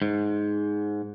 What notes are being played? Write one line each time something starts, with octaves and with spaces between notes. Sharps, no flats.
G#2